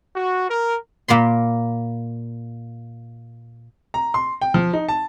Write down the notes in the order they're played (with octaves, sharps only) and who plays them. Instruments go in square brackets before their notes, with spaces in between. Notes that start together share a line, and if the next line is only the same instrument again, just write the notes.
[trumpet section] F#4
A#4
[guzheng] A#2 A#3 B5 C6
[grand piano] A#5
C6
G5
F3
D#4
A5